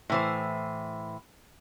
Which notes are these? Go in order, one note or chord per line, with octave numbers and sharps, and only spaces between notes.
A2 E3 C5